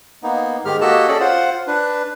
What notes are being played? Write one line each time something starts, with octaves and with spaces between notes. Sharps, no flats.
A#3 B3 D#4
G#2 D#3 G#3 G4 F6
A#3 F#4 G4 A4 D#5 A5
C#4 G#4 A4 D5
F4 C5 F#5
D4 B4